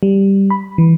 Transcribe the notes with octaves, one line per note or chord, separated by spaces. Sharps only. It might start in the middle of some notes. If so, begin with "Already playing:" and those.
G3
B5
E3